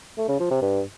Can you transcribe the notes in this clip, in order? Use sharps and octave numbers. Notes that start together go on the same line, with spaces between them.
A3
C#3
F3
C3
G2